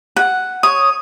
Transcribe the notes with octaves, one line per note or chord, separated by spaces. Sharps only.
F#5
C#5 D#6